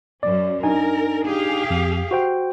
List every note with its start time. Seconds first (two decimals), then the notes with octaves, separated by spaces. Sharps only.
0.23 F#2 C#4 D5
0.63 D4 D#4 A#4 G#5
1.27 G4 G#4 F5
1.70 F2
2.11 F#4 C5 G5